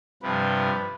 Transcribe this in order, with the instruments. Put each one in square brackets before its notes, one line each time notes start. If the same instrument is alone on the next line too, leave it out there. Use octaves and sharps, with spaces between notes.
[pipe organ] G2 C3 F3 [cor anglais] B4